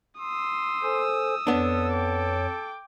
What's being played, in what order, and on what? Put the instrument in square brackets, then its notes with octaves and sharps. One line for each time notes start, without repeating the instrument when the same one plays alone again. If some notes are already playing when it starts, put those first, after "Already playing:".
[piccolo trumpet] C6 [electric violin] D#6 E6
[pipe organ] A4 C5 G#5
[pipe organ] F2 C#5 [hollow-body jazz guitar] B3 D4 [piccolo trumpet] A4
[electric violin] G5 D6